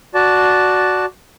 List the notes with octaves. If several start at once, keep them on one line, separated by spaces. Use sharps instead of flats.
F#4 D5 A5